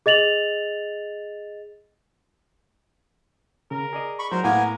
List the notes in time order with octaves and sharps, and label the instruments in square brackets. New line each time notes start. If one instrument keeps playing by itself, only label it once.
[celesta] G#4 D#5 A6 F7 F#7
[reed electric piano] C#3 [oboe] A#4
[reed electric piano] G#4 D5 D#5
[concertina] B5 C#6
[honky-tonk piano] F#3 [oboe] A#4 [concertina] C5
[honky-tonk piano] A2 [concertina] A#3 B3 G#5